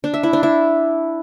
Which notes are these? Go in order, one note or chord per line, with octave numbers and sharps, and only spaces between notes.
D4
E5
E4
D4
E4